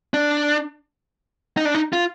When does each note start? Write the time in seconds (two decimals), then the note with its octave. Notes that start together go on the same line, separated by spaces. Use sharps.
0.14 D4
1.57 D#4
1.65 D4
1.75 D#4
1.93 F4